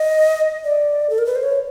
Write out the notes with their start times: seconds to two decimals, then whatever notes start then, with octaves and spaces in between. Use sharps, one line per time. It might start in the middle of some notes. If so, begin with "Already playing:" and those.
Already playing: D#5
0.64 D5
1.10 A4
1.18 A#4
1.26 B4
1.35 C5
1.43 C#5